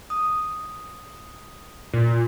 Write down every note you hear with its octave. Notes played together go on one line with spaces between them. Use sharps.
D#6
A#2